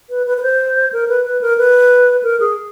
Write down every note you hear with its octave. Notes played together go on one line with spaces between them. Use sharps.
B4
B4
B4
C5
A#4
B4
B4
A#4
B4
A#4
G#4